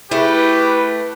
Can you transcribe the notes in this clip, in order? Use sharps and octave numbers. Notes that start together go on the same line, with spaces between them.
A3 E4 G4 G#4 B4